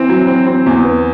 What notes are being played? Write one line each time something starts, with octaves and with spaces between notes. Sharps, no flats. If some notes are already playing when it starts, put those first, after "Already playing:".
Already playing: E3 C4
F#3
C4
C4
E2
B3